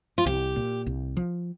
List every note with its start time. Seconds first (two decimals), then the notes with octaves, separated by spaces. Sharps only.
0.18 F4
0.26 C2 G4
0.56 A#2
0.86 C2
1.17 F3